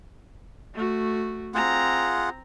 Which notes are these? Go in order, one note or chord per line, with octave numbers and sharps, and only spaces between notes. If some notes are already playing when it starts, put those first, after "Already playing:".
A3 F#4
C4 F4 G#4 F#5 A#5